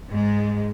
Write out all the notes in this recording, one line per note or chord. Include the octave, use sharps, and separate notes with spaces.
G#2 G#3